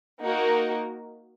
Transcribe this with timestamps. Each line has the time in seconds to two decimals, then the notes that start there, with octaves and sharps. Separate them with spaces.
0.23 A#3 D#4 F#4 A#4